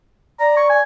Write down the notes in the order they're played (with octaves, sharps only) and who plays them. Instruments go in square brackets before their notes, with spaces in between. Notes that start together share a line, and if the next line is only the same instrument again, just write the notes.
[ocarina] D5 [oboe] A#5
[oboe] C#6
G#5